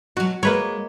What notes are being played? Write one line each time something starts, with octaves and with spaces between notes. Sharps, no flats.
B2 F#3 F#4
G#3 A#3 B4 C#5